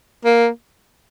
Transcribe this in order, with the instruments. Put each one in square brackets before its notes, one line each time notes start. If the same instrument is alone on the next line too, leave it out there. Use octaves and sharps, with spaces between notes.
[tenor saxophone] A#3